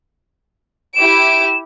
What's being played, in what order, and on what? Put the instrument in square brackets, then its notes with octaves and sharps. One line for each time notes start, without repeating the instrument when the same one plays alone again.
[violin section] E4 G4 D7 [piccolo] E7